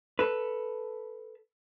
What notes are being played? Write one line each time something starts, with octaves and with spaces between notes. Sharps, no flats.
A4 B4